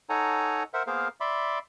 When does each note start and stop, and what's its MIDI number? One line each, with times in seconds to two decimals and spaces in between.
0.09 0.63 63
0.09 0.63 69
0.09 0.63 73
0.09 0.63 78
0.09 0.63 80
0.09 0.63 82
0.74 0.83 70
0.74 0.83 72
0.74 0.83 76
0.74 0.83 78
0.87 1.08 58
0.87 1.08 59
0.87 1.08 68
0.87 1.08 70
0.87 1.08 72
0.87 1.08 77
1.21 1.59 74
1.21 1.59 76
1.21 1.59 83
1.21 1.59 84
1.21 1.59 86